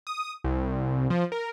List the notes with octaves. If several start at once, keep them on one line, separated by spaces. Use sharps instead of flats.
D#6
C2
F3
A#4